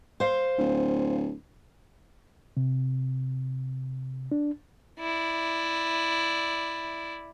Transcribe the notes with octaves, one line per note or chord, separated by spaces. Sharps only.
C5 F5
D1
C3
D4
E4 D5